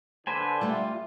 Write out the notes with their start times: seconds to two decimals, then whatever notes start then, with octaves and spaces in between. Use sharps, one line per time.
0.27 D3 B4 C5 G#5
0.61 G3 A3 F4 G4